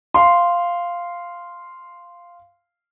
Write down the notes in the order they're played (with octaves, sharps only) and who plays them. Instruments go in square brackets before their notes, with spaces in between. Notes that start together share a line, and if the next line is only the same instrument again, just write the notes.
[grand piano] F5 C6